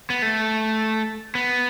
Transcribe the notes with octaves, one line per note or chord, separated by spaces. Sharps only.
B3
A3
B3